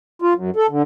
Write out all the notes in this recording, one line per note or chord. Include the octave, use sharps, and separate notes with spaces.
F4
F#2
A4
D3